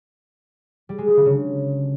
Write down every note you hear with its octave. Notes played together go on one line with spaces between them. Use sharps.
G3
G#3
F#3
D3
C#3